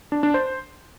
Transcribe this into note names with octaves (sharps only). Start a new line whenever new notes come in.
D4
D4
C5